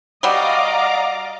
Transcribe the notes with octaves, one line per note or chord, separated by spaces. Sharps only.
F#3 G3 D5 D#5 F5 F#5 A#5 D6